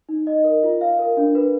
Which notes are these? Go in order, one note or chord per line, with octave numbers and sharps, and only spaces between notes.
D#4
D#5
A#4
F4
F5
A#4
D4
B4